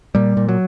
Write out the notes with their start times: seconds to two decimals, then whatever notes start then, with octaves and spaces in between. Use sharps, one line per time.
0.15 A#2 G3
0.37 A#2
0.49 F#3